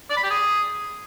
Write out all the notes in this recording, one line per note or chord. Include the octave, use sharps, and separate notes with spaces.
D5
B5
G4
G#4